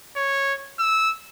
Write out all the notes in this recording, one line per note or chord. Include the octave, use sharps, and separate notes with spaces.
C#5
E6